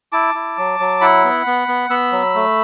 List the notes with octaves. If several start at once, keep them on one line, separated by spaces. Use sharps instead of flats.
E4 A5 D6
E4
F#3
F#3
E4 F#5 B5
B3
B3
B3
B3 B5 E6
F#3
A3